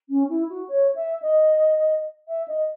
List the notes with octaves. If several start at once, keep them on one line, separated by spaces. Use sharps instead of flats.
C#4
E4
F#4
C#5
E5
D#5
E5
D#5